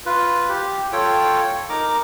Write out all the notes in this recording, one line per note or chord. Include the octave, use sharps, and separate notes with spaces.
F4 B4
G4
F4 A4 C#5 G5
D#4 A#4 A#5 D6